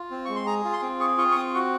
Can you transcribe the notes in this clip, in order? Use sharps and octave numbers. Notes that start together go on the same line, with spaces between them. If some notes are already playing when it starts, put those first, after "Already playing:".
Already playing: F4
C4
G#3 C#6
C6
G#4 A#5
F4
C6
C4
G#4 C#6
F4 C#6
C#6
C4 D#6
F#4 C#6